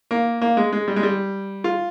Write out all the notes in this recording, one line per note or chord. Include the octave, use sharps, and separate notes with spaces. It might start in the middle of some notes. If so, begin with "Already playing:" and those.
A#3
A#3
G#3
G#3
G3
G#3
G3
F4